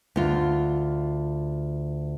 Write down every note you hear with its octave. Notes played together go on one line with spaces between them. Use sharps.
D2 F4